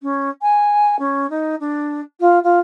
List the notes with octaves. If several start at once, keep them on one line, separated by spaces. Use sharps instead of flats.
C#4
G#5
C#4
D#4
D4
F4
F4